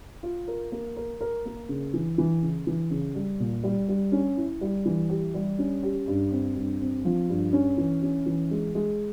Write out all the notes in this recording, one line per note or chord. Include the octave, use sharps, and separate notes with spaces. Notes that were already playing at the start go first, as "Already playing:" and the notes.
F4
A#4
A#3
A#4
A#4
A#3
C#3
E3
E3
C#3
E3
C#3
G3
A#2
G3
G3
C#4
E4
G3
E3
G4
G3
C#4
G4
G2
C4
G2
C4
F3
G2
C#4
E3
C#4
E3
G#3
G#3